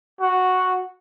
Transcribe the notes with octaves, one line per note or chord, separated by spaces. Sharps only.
F#4